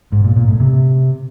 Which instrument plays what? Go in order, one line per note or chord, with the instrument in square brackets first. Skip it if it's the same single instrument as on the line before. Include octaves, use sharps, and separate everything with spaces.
[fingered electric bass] G#2
A#2
A#2
A2
C3